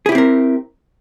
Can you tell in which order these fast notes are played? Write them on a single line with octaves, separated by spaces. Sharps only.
G#4 E4 G4 C4 A#4